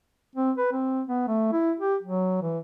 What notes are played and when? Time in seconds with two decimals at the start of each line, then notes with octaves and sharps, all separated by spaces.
0.36 C4
0.58 B4
0.72 C4
1.07 B3
1.28 A3
1.52 E4
1.80 G4
2.02 F#3
2.42 E3